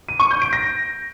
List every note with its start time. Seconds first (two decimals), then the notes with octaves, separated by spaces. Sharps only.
0.09 D#7
0.20 C#6
0.31 G6
0.42 D7
0.53 A#6